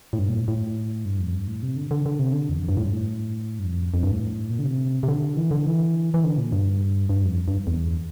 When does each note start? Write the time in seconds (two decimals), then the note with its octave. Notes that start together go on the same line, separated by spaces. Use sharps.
0.13 A2
0.19 G2
0.29 A#2
0.37 A2
0.48 A2
1.05 G2
1.19 F2
1.34 G2
1.48 A2
1.63 C3
1.76 D3
1.91 D3
2.06 D3
2.19 C3
2.33 D3
2.49 E2
2.58 F2
2.69 G2
2.77 A2
2.84 G2
2.92 A2
3.59 G2
3.64 F2
3.94 F2
4.03 G2
4.12 A2
4.50 A#2
4.59 D3
4.65 C3
5.03 C3
5.08 D3
5.37 E3
5.51 D3
5.66 E3
6.14 E3
6.24 D3
6.38 A#2
6.52 G2
7.09 G2
7.25 F2
7.48 G2
7.67 E2